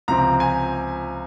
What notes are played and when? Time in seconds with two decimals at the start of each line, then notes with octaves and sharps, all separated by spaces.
0.08 C#2 C3 F3 C4 A#5
0.40 G#5